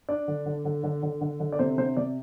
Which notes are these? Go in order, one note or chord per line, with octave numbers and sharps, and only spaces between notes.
D4 D5
D3
D3
D3
D3
D3
D3
D3
D5
C3 C5
C3 C5
C3 D5